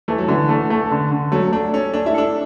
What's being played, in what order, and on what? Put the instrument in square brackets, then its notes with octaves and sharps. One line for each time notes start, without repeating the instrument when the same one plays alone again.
[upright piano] E3 [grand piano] A3
[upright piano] F#3
[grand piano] D3 [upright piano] E3
[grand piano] A3
A3
D3
D3
[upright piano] F#3 [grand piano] A3
[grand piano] A3 [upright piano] D4
[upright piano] C#4 [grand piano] A4
[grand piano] A3 [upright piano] D4
[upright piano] E4
[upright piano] D4 [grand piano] A4